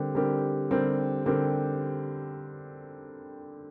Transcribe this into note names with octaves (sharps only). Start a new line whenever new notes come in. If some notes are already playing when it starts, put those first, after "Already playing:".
Already playing: D3 G3 C4 G4 A#4
D3 G3 C4 G4 A#4
D3 G3 C4 G4 A#4
D3 G3 C4 G4 A#4